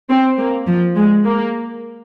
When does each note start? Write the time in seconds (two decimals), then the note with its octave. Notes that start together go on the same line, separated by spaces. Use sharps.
0.10 C4
0.39 A#3
0.68 F3
0.96 G#3
1.25 A#3